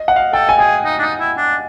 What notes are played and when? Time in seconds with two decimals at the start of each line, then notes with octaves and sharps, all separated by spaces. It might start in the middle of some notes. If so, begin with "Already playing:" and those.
Already playing: D#5
0.08 F#5
0.16 F5
0.33 A4 G5
0.49 G#5
0.59 G#4 G5
0.84 D#4
0.99 D4
1.02 D#4
1.20 E4
1.37 D4